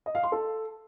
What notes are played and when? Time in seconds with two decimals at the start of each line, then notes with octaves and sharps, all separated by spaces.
0.06 D#5
0.15 F5
0.23 C6
0.32 A4